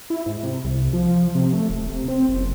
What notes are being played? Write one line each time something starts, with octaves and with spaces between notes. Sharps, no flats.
E4
G#2
C3
C2
F3
C3
A3
D#1
C3
C4
F#1